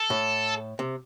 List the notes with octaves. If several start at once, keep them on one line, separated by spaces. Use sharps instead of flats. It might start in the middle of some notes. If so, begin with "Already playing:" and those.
Already playing: A4
A2
C3